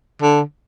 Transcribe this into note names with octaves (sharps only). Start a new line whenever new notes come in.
D3